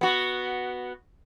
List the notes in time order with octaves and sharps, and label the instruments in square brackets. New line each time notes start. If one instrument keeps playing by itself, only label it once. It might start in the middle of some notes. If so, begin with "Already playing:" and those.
[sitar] B3 F#4